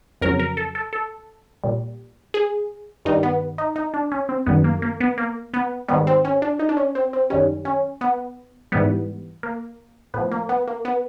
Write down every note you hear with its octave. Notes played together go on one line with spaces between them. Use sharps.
F2 C#3 F#3 A#4
A#4
A4
A4
A4
A#2 G3
G#4
G2 D#3 G3 D#4
B3
D#4
D#4
D4
C#4
C4
F#2 D#3 G3 B3
A#3
A#3
B3
A#3
B3
G#2 D#3 G3 B3
C4
C#4
D4
D#4
D4
C#4
C4
C4
F#2 D#3 G3 C#4
C#4
B3
G#2 E3 G3 B3
A#3
A2 F3 B3
A#3
B3
A#3
B3